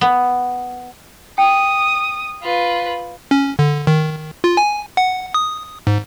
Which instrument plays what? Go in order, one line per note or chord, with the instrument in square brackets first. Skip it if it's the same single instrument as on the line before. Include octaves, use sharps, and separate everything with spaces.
[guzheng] B3
[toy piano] G5 [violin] D#6
[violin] F4 B4
[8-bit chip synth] C#4
D3
D#3
F4
G#5
F#5
D#6
G#2